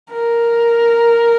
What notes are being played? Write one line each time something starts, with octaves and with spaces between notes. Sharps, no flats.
A#4